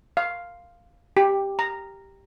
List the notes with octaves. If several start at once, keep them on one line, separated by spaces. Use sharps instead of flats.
F5
G4
A#5